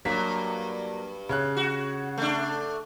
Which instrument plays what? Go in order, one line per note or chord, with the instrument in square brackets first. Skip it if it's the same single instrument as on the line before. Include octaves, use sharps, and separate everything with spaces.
[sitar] G2 [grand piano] F#3 A#3 B6
[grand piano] C#3 C#5 F#6
[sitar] F#4
A3 D4